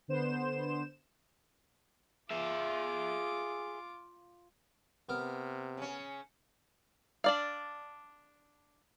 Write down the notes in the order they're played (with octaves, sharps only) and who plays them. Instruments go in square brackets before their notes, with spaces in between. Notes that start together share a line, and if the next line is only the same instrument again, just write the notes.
[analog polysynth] D3 B3 C5 E7
[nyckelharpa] F4 D6 [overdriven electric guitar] G#4 E5
[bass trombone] C3 [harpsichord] B3 A#4
[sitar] C#3 C#4
[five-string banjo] D4 D5 F5